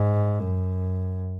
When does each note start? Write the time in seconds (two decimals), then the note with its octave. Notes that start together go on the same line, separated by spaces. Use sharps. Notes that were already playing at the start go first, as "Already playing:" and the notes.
Already playing: G#2
0.40 F#2